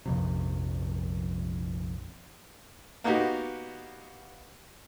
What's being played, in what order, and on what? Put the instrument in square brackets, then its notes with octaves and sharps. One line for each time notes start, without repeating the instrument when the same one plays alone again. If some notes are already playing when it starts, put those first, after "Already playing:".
[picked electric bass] A#1 F2 C3
[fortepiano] A#3 B3 D#4 F#4 G4